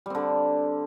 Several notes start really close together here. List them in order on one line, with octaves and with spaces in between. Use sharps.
G3 C4 D3